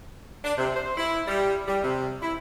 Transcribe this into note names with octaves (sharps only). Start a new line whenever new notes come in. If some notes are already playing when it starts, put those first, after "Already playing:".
D4
C3
C5
E4
G3
G3
C3
E4